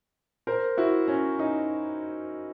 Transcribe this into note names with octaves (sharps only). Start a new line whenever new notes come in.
A#4 C5
E4 F#4
C#4
C#4 D#4